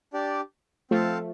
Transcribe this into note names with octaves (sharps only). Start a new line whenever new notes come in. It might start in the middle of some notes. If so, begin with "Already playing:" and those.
D4 G4 D5
F3 A3 C4 A4 F5 A5